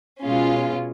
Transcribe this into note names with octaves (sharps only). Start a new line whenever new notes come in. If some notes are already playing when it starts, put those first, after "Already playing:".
B2 G#3 C#4 F4